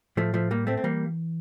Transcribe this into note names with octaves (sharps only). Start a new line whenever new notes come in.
A2 F3 A3
F3 A3
G3 A#3
A3 C4
C4
E3 G3 A#3